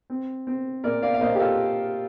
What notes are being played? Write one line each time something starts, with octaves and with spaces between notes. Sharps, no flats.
C4
C4
A#2 A#4 D5
D5 F5
F5
A#2 C5 D#5
G4
F4 A4